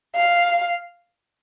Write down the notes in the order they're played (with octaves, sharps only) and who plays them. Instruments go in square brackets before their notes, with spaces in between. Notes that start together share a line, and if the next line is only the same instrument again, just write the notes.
[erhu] F5